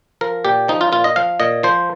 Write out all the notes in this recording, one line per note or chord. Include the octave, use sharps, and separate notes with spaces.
F3 A#4
A#2 G4
F3 D#4
F4
A#2 F4
D#5
F3 F5
A#2 D#5
F3 C5